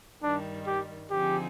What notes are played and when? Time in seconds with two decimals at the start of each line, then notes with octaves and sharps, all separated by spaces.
0.22 G2 D#3 G3 D4
0.66 G4
1.10 D3 F3 C4 D#4 G4 G#4